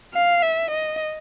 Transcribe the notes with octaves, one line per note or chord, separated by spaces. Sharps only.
F5
E5
D#5